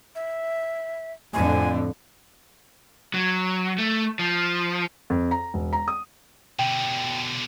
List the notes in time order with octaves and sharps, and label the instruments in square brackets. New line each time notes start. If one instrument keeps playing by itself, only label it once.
[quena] E5
[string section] F2 A2 D3 [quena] G#5
[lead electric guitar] F#3
A3
F3
[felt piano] F2
A#5
E1
A#5
D#6
[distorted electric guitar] B2 D3 [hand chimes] G5